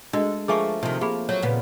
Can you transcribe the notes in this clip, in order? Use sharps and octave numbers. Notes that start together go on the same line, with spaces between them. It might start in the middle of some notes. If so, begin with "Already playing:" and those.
G#3 D4 F#4 A4 D#5
F3 A3 A#3 G#4 G#5 C#6
C3 D#3 F3
A#3 G4 G#4 B5
F#3 C#5
A#2 C#3 B3